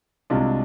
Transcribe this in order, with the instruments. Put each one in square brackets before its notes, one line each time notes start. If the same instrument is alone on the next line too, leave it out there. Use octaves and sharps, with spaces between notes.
[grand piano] C2 C3 G#3 D4 F4